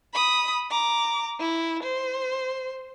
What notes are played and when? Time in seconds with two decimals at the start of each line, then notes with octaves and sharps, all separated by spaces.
0.14 B5 D#6
0.71 A#5 D6
1.40 E4
1.83 C5